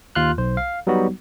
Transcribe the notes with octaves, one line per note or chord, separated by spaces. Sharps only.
D#2 F4 C6 F6 F#6
B1 C5
F5
F#3 G3 B3 D#4 F#4